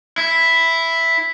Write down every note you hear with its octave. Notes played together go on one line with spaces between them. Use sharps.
E4